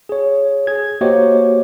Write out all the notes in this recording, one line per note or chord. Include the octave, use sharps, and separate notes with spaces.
G#4 C#5
G#4 G#6
A#3 F#4 G4 C5 C#5 D#5